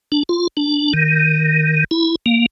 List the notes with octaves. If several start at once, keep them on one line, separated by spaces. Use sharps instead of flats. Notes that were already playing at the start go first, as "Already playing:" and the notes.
D4
F4
D4
D#3
E4
A#3